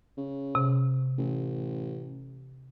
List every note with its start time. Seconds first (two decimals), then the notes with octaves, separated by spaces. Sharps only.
0.17 C#3
0.55 C3
1.18 A1